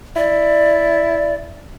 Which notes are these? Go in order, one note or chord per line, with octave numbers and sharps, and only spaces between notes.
E4 D5